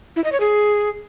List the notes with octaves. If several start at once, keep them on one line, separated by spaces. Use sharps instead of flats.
E4
D#5
C#5
G#4